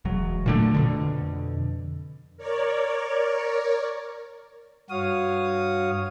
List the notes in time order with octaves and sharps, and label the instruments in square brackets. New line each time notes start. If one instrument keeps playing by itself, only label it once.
[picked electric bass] E1 F#3
A#2 D3 A3
F2 B2 D3
[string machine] A#4 C#5 D5
[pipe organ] G2 F#4 C#5 F5 D#6